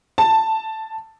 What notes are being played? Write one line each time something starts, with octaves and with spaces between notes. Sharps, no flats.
A5